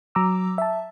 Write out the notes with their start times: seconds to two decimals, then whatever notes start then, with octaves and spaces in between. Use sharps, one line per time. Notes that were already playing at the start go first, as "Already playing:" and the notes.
0.15 F#3 A#5 D6 E6
0.58 E5 A5